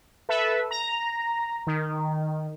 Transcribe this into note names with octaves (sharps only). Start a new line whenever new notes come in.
A4 B4 E5
A#5
D#3